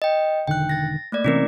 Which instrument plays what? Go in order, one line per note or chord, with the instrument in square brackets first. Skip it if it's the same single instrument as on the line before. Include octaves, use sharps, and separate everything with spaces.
[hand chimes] D#5 G5
[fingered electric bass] E1 D3 D#3 [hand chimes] G5 F#6
[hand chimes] A6 A#6
A3 A#3 D5
[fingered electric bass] C3 E3 C4 [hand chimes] C#4 E4 A#4